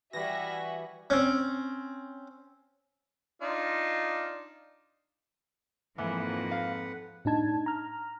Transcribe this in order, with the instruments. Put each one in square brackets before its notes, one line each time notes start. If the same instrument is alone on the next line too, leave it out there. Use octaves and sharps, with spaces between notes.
[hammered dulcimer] E3 G3 [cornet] F#4 [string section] E5 F#5 G#5 [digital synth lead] A#6
[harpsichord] C4 C#4
[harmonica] D4 D#4 F4
[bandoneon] F2 B4 F#5 [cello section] G#2 F3 A#3 [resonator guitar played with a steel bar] E3
[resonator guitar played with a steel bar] F5
[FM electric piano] A2 D4 D#4 A5 G#6
A#5 F6